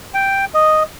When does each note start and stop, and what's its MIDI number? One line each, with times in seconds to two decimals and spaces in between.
0.14 0.45 79
0.54 0.83 75